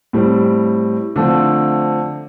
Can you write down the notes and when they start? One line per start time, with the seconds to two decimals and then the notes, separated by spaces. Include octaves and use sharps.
0.13 A2 G3 C4
1.16 D3 F3 A3 C4